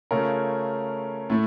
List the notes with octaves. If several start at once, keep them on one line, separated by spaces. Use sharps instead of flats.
C#3 A3 C#4 F4 A#4
A2 A3